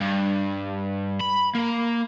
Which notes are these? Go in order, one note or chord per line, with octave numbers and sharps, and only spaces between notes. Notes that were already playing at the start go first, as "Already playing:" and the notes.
G2
B5
A#3